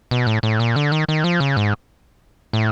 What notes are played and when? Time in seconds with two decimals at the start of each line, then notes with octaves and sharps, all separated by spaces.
0.11 B2
0.27 A2
0.43 A2
0.60 A#2
0.76 D3
0.92 D#3
1.08 D#3
1.24 F3
1.40 C#3
1.57 G#2
2.53 A2